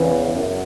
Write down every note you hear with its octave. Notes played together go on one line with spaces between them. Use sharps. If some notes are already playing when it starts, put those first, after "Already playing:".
Already playing: E2 C#3 E3
F#2